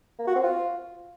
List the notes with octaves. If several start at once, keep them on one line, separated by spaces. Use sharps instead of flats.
A#3
F#4
C4
F4